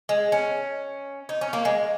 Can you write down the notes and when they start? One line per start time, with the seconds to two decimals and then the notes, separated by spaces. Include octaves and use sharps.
0.09 G#3
0.32 C#4
1.29 D#4
1.41 C#4
1.53 A#3
1.65 G#3